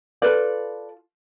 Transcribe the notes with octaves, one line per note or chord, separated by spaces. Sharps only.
F4 A4 B4 D5